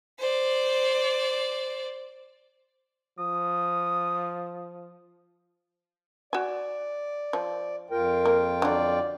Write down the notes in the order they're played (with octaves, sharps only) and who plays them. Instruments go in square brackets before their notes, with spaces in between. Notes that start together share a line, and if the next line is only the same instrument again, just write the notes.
[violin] C5 D5
[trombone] F3 [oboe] D#6
[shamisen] F#4 G#5 [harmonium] D5
[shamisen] F3
[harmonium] F2 F4 G5 [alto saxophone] A#4
[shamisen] A#3
[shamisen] D3 F#3 [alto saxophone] D5